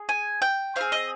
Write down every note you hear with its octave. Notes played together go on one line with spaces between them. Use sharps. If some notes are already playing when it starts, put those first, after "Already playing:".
Already playing: G#4
G#5
G5
C4 D#4 G#4 F5
D#5